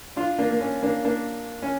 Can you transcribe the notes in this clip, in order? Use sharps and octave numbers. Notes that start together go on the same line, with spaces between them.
D4 F4
A#3 D4
A#3
C#4
A#3 D4
A#3 D4
C#4